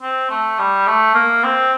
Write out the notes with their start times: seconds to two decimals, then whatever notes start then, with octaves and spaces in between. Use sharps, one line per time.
0.02 C4
0.30 A3
0.59 G3
0.87 A3
1.14 A#3
1.44 C4